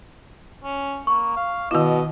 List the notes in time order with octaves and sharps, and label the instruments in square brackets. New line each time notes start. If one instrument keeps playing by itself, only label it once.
[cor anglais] C#4
[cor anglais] A#3 [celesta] C#6
[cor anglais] F5
[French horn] B2 [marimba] D#3 E4 [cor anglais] D#5